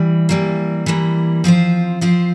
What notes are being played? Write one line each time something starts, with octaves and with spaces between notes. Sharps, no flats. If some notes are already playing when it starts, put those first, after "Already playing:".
Already playing: E3 G3
E3 G3 A#3
E3 G3 A#3
F3 C4 F4 C5
F3 C4 F4 C5